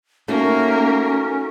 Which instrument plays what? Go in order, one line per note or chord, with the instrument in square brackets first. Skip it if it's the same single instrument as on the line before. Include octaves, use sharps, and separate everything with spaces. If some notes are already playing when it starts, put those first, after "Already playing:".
[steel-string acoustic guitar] A3 D#4 F#4 [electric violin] A#3 A#4 [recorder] C#4